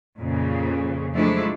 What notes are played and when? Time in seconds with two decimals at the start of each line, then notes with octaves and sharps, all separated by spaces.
0.19 F2 A#2 C#3
1.15 F3 F#3 G#3 A3 D4 E4